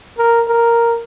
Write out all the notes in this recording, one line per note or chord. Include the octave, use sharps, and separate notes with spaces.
A#4
A#4